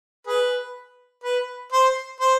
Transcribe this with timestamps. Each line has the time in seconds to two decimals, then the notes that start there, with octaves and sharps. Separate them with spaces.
0.27 G#4 B4
1.24 B4
1.72 C5
2.21 C5